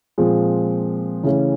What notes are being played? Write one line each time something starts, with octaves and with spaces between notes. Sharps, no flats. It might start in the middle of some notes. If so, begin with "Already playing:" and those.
A#2 F3 G#3 C4
C#3 E3 A3 C#4